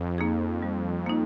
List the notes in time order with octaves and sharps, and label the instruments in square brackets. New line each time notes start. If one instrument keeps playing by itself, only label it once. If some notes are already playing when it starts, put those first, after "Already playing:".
Already playing: [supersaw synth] F2
[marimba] A#3 D#4 G#4
G3
A#3 D#4